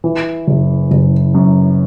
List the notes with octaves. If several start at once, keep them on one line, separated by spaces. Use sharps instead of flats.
E3
F#1
F#1
F#2